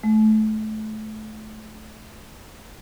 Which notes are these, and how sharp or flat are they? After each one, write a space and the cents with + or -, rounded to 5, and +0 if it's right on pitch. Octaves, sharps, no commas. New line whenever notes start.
A3 -25